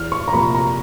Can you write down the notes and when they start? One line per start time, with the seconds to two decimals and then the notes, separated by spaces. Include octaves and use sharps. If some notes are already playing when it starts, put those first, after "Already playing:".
Already playing: E2 F6
0.12 C#6
0.28 A#5
0.33 C3 F3 A#3 B5
0.55 A#5